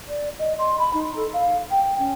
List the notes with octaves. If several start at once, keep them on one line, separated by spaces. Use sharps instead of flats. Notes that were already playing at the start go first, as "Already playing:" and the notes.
D5
D#5
C6
B5
D#4
A4
F5
G5
C#4